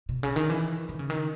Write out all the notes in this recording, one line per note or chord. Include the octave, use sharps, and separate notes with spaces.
B2
C#3
D#3
E3
D#3
C#3
D#3